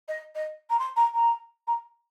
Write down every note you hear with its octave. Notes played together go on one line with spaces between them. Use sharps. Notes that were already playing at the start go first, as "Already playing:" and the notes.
D#5
D#5
A#5
C6
A#5
A#5
A#5